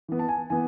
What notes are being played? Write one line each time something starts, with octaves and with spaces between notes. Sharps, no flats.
E3 B3
A5
G#5
E3 B3 G#5